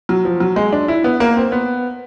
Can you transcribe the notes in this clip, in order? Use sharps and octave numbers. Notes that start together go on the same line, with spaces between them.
F#3
F3
F#3
G#3
D4
E4
B3
A#3
C4
B3